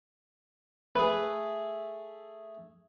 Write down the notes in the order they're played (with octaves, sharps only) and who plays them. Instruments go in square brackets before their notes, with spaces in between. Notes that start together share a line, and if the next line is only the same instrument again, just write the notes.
[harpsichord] A3 G#4 [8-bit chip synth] B4